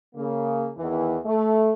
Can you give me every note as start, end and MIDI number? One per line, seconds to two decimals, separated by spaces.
0.16 0.69 49
0.16 0.69 58
0.78 1.16 40
0.78 1.16 51
0.78 1.16 52
1.26 1.73 57